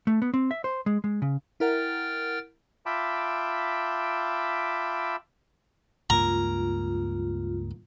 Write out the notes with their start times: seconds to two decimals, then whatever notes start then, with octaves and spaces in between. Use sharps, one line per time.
0.07 A3
0.22 B3
0.34 C4
0.51 E5
0.64 C5
0.86 G#3
1.04 G#3
1.22 C#3
1.60 E4 A#4 F#5 G5 F6 A6
2.86 F4 E5 G5 A5 B5 D6
6.10 C#2 G2 A#3 F4 A#5